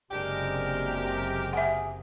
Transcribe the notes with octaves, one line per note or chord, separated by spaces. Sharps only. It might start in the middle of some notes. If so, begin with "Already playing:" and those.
F#1 C3 G#3 D4 G4 A#4
G#4 E5 F#5